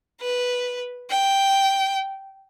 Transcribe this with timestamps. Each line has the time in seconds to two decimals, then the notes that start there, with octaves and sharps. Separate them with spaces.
0.21 B4
1.10 G5